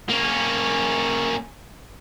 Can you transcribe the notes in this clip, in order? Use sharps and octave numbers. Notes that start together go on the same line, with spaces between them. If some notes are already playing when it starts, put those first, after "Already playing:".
A#3 C#4